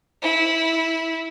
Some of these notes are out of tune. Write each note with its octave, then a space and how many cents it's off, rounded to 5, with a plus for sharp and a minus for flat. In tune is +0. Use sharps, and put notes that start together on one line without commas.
E4 -15